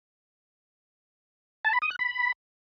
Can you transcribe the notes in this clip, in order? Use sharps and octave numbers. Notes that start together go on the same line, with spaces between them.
A5
B5
D#6
F#6
B5